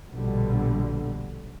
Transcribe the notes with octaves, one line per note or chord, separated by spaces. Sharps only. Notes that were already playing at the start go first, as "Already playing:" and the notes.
A#1 B2 D3 G3